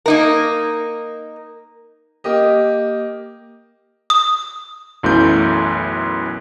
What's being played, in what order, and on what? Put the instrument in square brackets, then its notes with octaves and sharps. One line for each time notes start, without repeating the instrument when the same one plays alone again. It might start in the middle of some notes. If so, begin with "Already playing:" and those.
[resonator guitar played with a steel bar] A#3 D#4 A#4
[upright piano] A#3 G4 D#5
[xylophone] D#6
[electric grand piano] B1 F#2 E3 A3 E4 G6